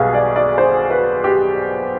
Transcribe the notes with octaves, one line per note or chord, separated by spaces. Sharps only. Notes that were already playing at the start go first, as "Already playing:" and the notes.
Already playing: B1 B2 G3 B3 G#4 F5
D5
D5
C5
B4
G4